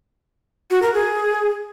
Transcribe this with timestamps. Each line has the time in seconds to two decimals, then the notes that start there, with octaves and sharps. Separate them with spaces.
0.71 F#4
0.82 A#4
0.94 G#4